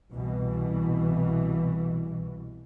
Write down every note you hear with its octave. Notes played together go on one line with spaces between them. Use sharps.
C2 B2 E3